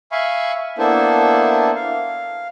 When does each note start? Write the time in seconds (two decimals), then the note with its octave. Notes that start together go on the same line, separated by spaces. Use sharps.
0.12 E5 F5 G#5 B5 C#6
0.78 A#3 B3 D4 E4 A4 C5
1.75 F5